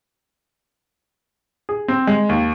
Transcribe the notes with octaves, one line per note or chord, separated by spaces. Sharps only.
G#4
C4
G#3
D#2